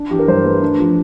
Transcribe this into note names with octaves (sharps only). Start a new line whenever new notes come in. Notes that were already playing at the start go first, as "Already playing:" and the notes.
Already playing: D4
E3 G4
A#4
G2 C5
A3 B4
D4
F3